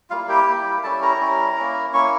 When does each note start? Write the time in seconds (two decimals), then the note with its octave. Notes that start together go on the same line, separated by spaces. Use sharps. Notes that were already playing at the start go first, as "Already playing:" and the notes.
0.10 G3 A#3 E4 F4 F5
0.29 G4 G5
0.47 G3 A#3 E4
0.83 G3 C#4 E4 A4 A5
1.02 A#4 A#5
1.20 G3 C#4 E4
1.57 A#3 C#4 E4
1.93 A#3 C#4 E4 C#5 C#6